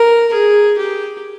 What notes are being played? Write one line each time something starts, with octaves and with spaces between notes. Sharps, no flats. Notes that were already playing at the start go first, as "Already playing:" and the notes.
Already playing: A#4
G#4
G4